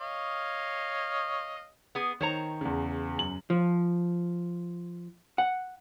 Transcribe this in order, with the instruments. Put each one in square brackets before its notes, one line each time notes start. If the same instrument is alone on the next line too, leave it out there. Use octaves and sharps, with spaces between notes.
[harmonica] C#5 D#5 F5
[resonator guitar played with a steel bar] B3 G#4
[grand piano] D#3 [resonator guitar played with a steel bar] C5 C#5 A#5
[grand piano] E2 C#3
F#2 F#7
[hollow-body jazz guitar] F3
F#5